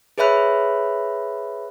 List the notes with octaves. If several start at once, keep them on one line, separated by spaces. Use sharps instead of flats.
G#4 B4 C#5 E5 B5 F#6